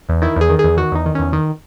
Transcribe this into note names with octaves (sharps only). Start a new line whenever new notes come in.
E2
D#3 E4
E2 G#4
D#3
G#4
E2
D#3 F#4
E2 D#4
D#3
E2 C#4
D#3